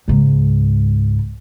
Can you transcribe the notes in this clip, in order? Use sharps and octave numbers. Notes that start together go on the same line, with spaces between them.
C#2 G#2